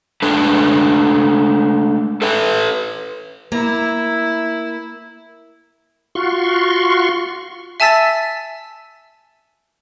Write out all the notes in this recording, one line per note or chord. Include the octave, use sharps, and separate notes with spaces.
G#3 A3 D4 A4 B4
A4 B4 E5
A#3 E4 A#5
F4 F#4 C6 C#6
E5 G#5 A5 E6 A6 B6